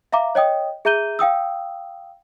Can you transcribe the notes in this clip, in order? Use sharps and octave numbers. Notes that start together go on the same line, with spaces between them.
E5 F5 A#5 D6
C#5 D#5 G5 D#6
G#4 E5 A#5 G6 D#7 G7
F5 G5 D#6 E6